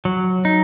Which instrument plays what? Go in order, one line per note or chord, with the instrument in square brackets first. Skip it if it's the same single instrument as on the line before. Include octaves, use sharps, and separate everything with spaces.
[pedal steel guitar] F#3
D#4